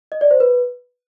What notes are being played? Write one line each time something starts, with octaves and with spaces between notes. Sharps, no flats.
D#5
D5
C5
B4